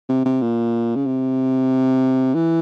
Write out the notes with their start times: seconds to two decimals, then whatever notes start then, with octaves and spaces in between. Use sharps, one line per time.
0.09 C3
0.25 C3
0.41 A#2
0.95 C#3
1.06 C3
2.34 E3